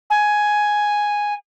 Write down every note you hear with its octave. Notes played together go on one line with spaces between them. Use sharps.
G#5